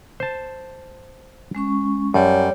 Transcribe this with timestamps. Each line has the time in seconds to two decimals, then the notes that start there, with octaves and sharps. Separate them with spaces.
0.20 C5 A5
1.55 G#3 C#4 C#6
2.14 F#2 G3 C#5